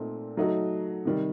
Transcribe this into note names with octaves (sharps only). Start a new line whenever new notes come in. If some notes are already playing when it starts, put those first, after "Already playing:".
Already playing: A#2 A3 C4 D#4
F#3 A3 D#4 F#4
C3 D#3 G3